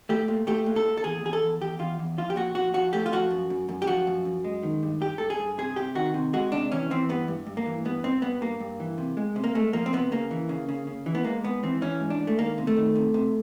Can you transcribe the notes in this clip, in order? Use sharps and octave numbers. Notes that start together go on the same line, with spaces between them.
A3 G4
A#2
A3 G4
A#2
A4
A#2
A4
E2 G#4
E2 G#4
A4
E2
E2 G4
E2 F4
E2
F3 F4
G4
A#2 F#4
F3 F#4
F3 F#4
A3 G4
F4
F3 F#4
F#2
F#2
F#2
G4
F3 F#4
F#2
F#2
G#3
D#3
G2
G2 G4
G2 A4
G#4
G2
C3 G#4
C3 G4
D#3 F#4
C3
G#3 F#4
C3 D4
E3 C#4
E3 C4
G2 B3
G2
G2
A#3
E3
G2 B3
G2 C4
G2 B3
G2 A#3
G2
E3
C3
G#3
C3
A#3
G#3 A3
F3 A#3
C4
C3 B3
C#3 A#3
E3
C#3
C#3
C#3
E3
B3
G#3 A#3
G#2 B3
E3 C4
E3 C#4
G#2
D4
G#2
A3
D#3 A#3
C3
A3
D#3
C3
C3